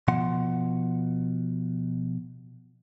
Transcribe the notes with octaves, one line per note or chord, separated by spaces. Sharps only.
B2 F3 F#5 C6